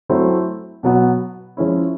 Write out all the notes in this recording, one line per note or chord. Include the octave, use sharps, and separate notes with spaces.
F#3 A3 C4 E4
B2 F#3 B3
F3 G#3 C#4 E4